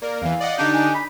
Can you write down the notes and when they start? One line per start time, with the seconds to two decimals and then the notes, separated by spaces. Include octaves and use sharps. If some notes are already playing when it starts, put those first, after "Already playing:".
0.02 A#3 A#4 D5
0.22 E2 E3 F5
0.40 D5 D#5 F#5
0.58 D3 D4 D#4 G4
0.73 G#5
0.94 B5